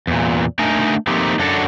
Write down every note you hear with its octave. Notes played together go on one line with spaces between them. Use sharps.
E2 A#2
A3 D4 D#4 A#4 D#5 G#5
F3 A3 A#3 C4 D#4 G4
F#2 F#3 D4 F#4 A4